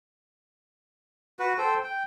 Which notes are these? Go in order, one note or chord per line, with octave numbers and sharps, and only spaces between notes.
F#4 B4
A4 C5 G5
G5